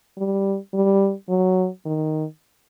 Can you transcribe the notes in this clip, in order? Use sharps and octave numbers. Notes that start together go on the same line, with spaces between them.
G3
G3
F#3
D#3